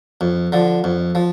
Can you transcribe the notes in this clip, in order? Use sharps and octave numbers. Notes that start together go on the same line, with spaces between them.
F2
D3 F3
F2
F3